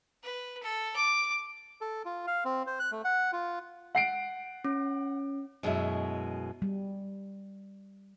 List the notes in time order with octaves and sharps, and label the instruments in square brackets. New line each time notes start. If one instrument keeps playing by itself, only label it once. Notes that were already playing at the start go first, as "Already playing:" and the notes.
[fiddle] B4
A4
D6
[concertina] A4
F4
F5
C4
C5
F#6
A3
F#5
F4
[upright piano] F#5 C7 D7
[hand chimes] C#4
[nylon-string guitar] F#2 B2 G#3 A3 E4
[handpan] G3